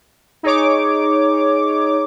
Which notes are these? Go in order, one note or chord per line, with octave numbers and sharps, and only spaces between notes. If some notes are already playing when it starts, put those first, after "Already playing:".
D#4 G#4 C#5 D6